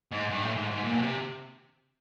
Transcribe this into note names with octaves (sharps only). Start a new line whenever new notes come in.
G#2
G2
A2
G#2
G#2
A#2
B2
C3